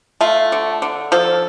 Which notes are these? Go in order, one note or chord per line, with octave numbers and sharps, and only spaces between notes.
A3 F4
D3
D3
F3 A4